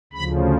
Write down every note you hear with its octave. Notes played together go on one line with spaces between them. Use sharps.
D2 C#3 F3 B5